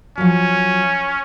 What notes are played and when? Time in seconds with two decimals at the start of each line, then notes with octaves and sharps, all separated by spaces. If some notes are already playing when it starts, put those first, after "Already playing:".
0.18 F3 F#3 C#4